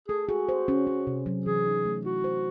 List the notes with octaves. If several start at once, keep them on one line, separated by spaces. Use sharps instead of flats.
G#4 A4
F#4 G#4
C5
C#4
C#4
C3
F#3
E3 G#4
D#4
A3
E4 F#4
C5